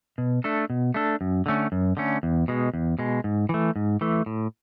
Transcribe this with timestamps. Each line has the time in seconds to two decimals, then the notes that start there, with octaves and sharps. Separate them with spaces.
0.18 B2
0.44 A3 D4 A4
0.70 B2
0.94 A3 D4 A4
1.21 F#2
1.46 D3 A3 C#4
1.72 F#2
1.97 D3 A3 C#4
2.23 E2
2.48 B2 G#3
2.74 E2
2.99 B2 G#3
3.24 G#2
3.49 E3 A3
3.76 G#2
4.01 E3 A3
4.26 A2